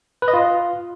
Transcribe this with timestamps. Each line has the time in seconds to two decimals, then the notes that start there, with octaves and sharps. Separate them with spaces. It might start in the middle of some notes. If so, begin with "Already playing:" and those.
0.22 B4
0.28 D#5
0.33 F4